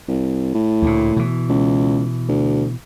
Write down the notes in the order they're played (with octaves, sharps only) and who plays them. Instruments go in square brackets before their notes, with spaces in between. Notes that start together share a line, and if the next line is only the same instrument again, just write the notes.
[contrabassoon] C2
A2
[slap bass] D2 A#2
B2 E3
[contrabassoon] C#2
D2